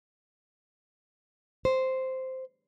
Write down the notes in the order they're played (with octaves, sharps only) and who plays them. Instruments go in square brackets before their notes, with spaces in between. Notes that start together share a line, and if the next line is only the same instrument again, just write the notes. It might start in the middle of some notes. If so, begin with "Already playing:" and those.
[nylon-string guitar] C5